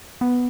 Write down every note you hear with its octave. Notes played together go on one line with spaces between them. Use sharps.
B3